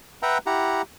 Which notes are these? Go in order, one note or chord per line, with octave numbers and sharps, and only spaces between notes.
B4 E5 F#5 G5 A#5
E4 G4 F#5 A#5